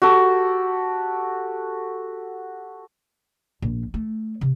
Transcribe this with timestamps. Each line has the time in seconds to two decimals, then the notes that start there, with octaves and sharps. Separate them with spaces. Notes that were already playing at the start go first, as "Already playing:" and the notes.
0.02 F#4 G4 A4
3.62 A#1
3.94 A3
4.41 C3